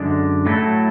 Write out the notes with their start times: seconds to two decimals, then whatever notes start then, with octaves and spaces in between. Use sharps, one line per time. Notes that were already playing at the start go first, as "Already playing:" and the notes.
Already playing: F#2 D3 G#3 D4
0.46 A2 F#3 A3 E4 A4